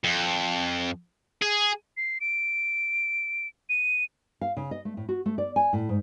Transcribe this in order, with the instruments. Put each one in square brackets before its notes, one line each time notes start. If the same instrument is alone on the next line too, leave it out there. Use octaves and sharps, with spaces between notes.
[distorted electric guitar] F2
G#4
[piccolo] C7
D7
D#7
[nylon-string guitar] F5
C#3
D#5
A3
A2
F#4
A3
D5
G#5
A2
G#2